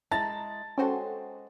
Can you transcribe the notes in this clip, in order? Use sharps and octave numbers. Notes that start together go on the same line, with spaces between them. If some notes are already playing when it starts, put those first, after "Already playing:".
G#3 E4 A5 A#5 A6
G#3 C#4 F#4 A4 C5 G5